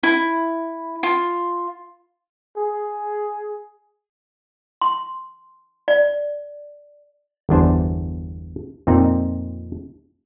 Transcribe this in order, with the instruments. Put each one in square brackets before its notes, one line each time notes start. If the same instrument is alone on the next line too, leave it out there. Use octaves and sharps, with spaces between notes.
[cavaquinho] E4
F4
[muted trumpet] G#4
[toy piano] C6
D5
[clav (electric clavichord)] G1 E2 D4 C5
F2 A#2 C4 D#4